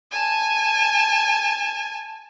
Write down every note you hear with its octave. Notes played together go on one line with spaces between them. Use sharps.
G#5 A5